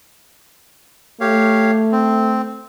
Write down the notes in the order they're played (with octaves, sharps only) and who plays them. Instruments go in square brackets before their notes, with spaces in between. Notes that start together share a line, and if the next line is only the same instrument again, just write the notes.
[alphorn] A3 [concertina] G4 C#5 F5
[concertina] C4